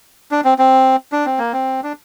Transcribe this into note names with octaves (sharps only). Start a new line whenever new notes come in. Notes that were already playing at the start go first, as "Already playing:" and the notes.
D4
C4
C4
D4
C4
A#3
C4
D4